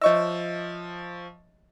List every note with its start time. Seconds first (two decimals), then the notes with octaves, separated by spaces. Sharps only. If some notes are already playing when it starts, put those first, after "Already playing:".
0.02 F3 C#5 D#5 E5 C#6 E6